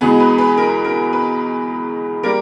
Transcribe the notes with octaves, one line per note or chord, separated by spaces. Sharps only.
E2 B2 G#3 B3 G#4
B4
B4
A#4
A#4
B4
G3 A#3 A#4